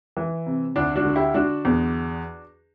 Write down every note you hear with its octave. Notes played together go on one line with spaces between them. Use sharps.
E3
C3
D2 D4
D4 F#4
D3
E4 G4
D3 D4 F#4
E2